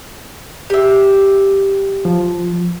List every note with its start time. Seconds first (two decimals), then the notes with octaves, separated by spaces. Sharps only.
0.70 G4 E5
2.05 F3